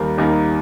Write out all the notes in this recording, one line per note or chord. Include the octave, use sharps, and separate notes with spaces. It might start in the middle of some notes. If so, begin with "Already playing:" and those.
Already playing: D#2 D#3 G3 A#3
D#2 D#3 G3 A#3